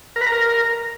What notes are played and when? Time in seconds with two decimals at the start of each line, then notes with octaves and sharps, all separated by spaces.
0.16 A#4
0.21 B4
0.27 A#5
0.32 A#4